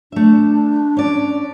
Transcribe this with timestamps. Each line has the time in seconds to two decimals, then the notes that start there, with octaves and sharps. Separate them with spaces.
0.12 A3 D4 E5
0.97 C#4 D5